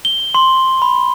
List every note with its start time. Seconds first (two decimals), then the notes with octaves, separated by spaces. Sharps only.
0.05 G7
0.34 C6
0.82 B5